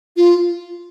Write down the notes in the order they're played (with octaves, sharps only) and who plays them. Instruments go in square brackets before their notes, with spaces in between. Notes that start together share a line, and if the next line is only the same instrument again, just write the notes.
[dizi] F4